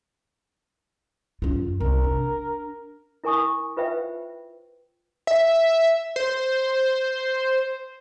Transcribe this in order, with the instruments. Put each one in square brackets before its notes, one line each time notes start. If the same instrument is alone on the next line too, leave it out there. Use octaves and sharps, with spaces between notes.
[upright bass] F#2 F4
[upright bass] C2 [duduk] A#4
[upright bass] D4
[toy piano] E4 A#4 G#5 C#6 D#6
F4 B4 C5 E5 G5
[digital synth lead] E5
C5